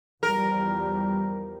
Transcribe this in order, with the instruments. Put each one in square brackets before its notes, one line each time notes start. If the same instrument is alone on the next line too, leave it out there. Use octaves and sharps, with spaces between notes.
[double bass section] E2 F3 G3 [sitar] A#4